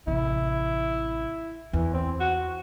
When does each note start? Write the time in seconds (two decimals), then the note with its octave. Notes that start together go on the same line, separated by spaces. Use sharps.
0.07 A1 C3 E4
1.73 E2 E3
1.93 C4
2.20 F#4